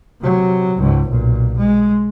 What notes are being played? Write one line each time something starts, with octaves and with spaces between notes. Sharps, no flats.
C3 F#3
C#2 G#2
B1 A#2
G#3